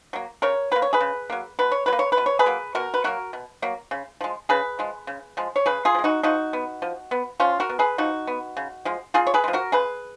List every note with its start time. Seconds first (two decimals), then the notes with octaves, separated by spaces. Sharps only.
0.13 F#3 A#3
0.42 C#3 A#4 C#5
0.71 F#3 A#3 B4
0.82 C#5
0.93 G#4 B4
1.01 C#3
1.30 F#3 A#3
1.59 B2 B4
1.72 C#5
1.86 F#3 B4
1.93 A#3
1.99 C#5
2.12 B4
2.17 B2
2.26 C#5
2.39 G#4 B4
2.46 F#3 A#3
2.75 B2 F#4 A#4
2.94 B4
3.04 F#3 A#3 F#4 A#4
3.33 B2
3.62 F#3 A#3
3.91 C#3
4.21 F3 G#3
4.49 C#3 G#4 B4
4.79 F3 G#3
5.07 C#3
5.37 F3 G#3
5.56 C#5
5.66 C#3 G#4 B4
5.85 F4 G#4
5.95 F3
5.99 G#3
6.04 D#4 F#4
6.23 F3 D#4 F#4
6.53 B3
6.82 F3
7.11 B3
7.40 F3 C#4 F4
7.60 F#4 A#4
7.69 B3
7.79 G#4 B4
7.98 F3 D#4 F#4
8.27 B3
8.57 C#3
8.85 F3 G#3
9.14 C#3 F4 G#4
9.27 C#5
9.34 G#4 B4
9.44 F3 G#3
9.53 F#4 A#4
9.72 C#3 G#4 B4